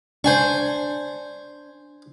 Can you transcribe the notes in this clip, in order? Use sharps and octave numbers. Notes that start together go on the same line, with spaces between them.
D4 C5 G#5 C#6